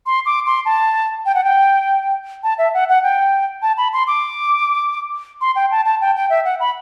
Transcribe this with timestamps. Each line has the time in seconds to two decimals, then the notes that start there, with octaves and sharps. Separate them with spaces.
0.06 C6
0.26 D6
0.46 C6
0.66 A5
1.26 G5
1.35 F#5
1.44 G5
2.43 A5
2.58 E5
2.74 F#5
2.89 F#5
3.03 G5
3.62 A5
3.78 B5
3.93 C6
4.07 D6
5.41 C6
5.56 G5
5.71 A5
5.85 A5
6.01 G5
6.16 G5
6.30 E5
6.45 F#5
6.60 B5